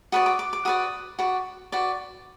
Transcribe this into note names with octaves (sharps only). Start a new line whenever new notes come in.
F#4 B4 D5 D#6
D6
D6
D6
F#4 B4 D5 D#6
F#4 B4 D5
F#4 B4 D5